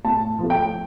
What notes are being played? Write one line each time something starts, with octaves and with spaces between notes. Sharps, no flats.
A2 A5
F3 A3
G5